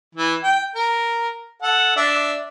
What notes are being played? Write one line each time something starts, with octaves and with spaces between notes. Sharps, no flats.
E3
G5
A#4
A4 F#5
D4 E5